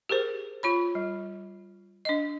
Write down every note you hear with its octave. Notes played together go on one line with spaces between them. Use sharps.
G4 G#4 A#4 C5
F4 C#5 B5
G3
D4 D#5